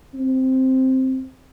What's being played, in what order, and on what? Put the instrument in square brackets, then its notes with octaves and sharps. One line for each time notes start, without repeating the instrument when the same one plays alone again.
[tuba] C4